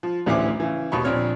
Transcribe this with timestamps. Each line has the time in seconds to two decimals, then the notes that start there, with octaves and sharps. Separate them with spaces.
0.03 F3
0.26 A1 D2 E3 C5 E5 D6
0.60 C#3 E3
0.92 D#2 B2 D#4 B5 C#6
1.04 A#1 D3 F3 C4 C#5 F6